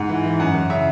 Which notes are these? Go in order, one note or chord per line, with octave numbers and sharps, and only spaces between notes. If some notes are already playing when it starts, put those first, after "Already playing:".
Already playing: G#2 F#5
E3
E3
F#2 F#5
F#2 F#5
C#3 E5